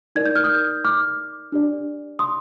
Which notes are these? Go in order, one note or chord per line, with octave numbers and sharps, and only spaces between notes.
D#4 A#4 D5 G#6
G6
F6
D#6 G6
D6 F6
D4 G4 D5
C6 D#6